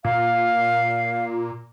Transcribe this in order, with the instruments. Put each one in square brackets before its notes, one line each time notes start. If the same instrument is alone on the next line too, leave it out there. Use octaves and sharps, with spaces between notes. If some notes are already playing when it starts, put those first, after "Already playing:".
[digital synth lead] A#2 [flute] F5